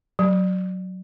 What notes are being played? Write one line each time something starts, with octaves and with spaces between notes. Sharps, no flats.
F#3